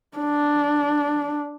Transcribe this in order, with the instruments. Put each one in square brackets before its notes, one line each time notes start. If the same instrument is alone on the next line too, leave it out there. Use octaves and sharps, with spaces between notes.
[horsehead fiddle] D4